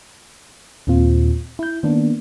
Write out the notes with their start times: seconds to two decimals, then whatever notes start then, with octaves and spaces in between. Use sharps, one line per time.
0.87 D#2 A#2 C4 F4
1.59 E4 G6
1.83 D#3 A#3 B3 D4